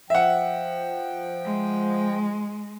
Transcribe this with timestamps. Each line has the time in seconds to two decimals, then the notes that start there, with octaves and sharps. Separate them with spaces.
0.10 F3 E5 F#5 G5
1.44 G#3